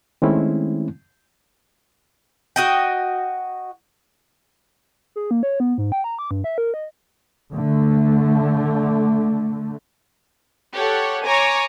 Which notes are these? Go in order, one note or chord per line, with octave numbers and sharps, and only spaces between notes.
D#3 G#3 A3 C4 C#4 E4
F#4 D#5 G5
G#4
A#3
C#5
B3
G#2
G5
A#5
D6
G2
E5
A#4
D#5
D3 A3
G4 A4 C#5 F#5
C#5 G#5 A#5 D6